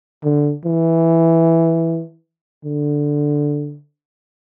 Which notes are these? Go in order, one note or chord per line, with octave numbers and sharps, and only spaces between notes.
D3
E3
D3